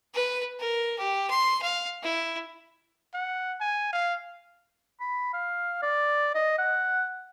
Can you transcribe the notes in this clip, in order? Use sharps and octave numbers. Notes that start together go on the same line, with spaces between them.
B4
A#4
G4
C6
F5
E4
F#5
G#5
F5
B5
F5
D5
D#5
F#5